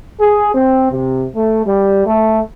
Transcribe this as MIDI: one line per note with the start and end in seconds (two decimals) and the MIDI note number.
0.20 0.52 68
0.54 0.90 60
0.91 1.26 48
1.35 1.62 57
1.65 2.02 55
2.06 2.40 57